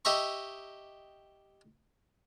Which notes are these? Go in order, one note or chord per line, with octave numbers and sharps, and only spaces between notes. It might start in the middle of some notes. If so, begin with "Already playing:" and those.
G4 D#5 E5 A#5 C#6